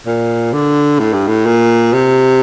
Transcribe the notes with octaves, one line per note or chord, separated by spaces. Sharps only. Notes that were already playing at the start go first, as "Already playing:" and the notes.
A#2
D3
A2
G2
A2
A#2
C3